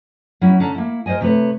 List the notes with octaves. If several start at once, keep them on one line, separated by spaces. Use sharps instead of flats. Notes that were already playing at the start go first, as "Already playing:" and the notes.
F#3 C#4 E4
D3 C#4 A4 A5 A#5
A#3 E4
A#4 C5 D5 D#5 G#5
C3 A3 B4 C#5